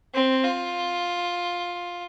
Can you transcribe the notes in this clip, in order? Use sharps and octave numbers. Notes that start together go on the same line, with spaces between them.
C4
F4